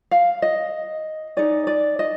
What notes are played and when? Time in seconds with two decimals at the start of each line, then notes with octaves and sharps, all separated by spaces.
0.11 F5
0.42 D#5
1.37 D#4 G#4 D5
1.67 D5
1.99 D#5